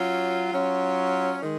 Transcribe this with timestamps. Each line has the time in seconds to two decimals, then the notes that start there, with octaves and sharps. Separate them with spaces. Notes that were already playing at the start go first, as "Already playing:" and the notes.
Already playing: F#3 C#4 F4
0.51 F#3 C#4 F4
1.41 D#3 G#3